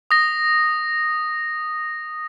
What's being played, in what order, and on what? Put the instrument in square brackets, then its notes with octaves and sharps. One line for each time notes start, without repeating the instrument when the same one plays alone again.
[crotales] D#6 A#6